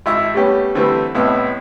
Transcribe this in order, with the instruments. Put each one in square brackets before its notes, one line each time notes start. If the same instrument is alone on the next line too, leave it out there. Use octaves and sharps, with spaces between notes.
[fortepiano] G#1 E4 E5
G3 A3 B3 C#4 G4
D3 E3 G3 A3 C4 E4
C2 A2 B3 D#5 E5